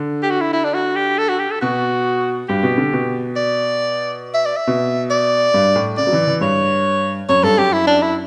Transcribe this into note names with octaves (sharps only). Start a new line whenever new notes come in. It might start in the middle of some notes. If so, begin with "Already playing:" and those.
Already playing: D3
G4
F#4
E4
E4
D4
F#4
G4
A4
F#4
G4
A4
B2 F#4
G2 G4
B2
D3
B2
D5
E5
D5
E5
B2
D5
G2
A2
C#3 D5
F#3
E3
E3
G2 C#5
F#2 C#5
G2 A4
F#2 G4
E4
D4
E4